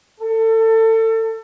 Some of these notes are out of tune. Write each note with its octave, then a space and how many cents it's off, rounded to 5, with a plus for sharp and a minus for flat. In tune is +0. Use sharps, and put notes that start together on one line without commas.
A4 +30